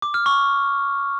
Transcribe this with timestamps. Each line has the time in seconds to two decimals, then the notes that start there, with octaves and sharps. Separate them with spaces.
0.02 D6
0.14 F6
0.26 C#6